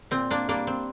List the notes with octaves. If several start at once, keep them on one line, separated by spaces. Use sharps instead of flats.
A#2 C4
A#3 D4
G3 A#3 D4
C4